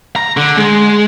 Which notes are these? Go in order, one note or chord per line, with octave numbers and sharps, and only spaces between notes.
A#5
D3
G#3